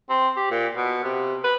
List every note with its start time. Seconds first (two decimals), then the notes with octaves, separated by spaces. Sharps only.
0.10 C4
0.37 G4
0.51 A#2
0.74 B2
1.04 C3
1.44 B4